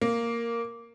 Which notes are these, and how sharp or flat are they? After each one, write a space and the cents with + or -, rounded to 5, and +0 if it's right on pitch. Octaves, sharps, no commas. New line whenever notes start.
A#3 -5